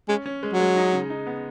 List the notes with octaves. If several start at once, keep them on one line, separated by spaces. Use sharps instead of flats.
G#3 C#4
C#4
G#3
F#3
G#3
D#4
C#3
D#4
B3